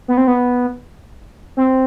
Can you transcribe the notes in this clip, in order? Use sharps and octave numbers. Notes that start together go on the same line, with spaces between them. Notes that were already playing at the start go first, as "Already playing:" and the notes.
B3
C4
B3
C4